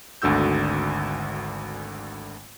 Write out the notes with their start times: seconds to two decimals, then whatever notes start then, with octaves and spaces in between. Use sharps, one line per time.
0.22 G#1 D2 D3 F#4 E6 G6